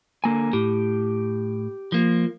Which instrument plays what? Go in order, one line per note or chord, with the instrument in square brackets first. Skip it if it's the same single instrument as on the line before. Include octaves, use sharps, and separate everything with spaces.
[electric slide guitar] D3 A#3 G#5
[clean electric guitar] A2 [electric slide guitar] G4
[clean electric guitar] F3 A#3